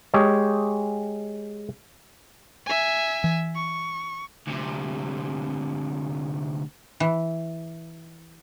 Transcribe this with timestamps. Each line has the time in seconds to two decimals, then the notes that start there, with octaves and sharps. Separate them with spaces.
0.14 G#3 G4 G#4 C#5
2.66 E5 G#5
3.24 E3
3.55 C#6
4.48 D2 C3
7.00 E3